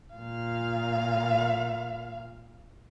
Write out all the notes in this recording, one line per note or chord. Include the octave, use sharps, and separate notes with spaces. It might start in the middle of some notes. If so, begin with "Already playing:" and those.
A#2 F5